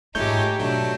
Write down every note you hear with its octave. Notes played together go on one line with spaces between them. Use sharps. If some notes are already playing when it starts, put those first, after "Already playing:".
G#2 G#3 A3 D#4 F4 G4 C#5 G6
B2 F#3 A3 D4